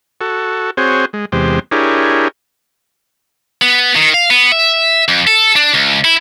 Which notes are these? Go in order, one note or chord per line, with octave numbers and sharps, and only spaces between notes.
F#4 A4
C4 F#4 G#4 C5 C#5
G#3
E2 C3 G#3 G4 C5
D4 E4 G4 G#4 A#4 C#5
B3
D#3
F5
B3
E5
F2
A4
D4
C#2
E4